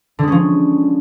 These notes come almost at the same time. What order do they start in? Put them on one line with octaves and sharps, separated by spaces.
D3 G#3 C#4 F3